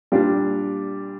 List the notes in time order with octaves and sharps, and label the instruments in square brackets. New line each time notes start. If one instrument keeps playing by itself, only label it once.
[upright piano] A#2 G3 D4 F4